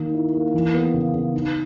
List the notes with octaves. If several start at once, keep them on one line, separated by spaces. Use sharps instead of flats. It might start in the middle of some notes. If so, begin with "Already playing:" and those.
Already playing: D#3 A#3
E4
A#3
E3
B3
C#3
C#3
D#4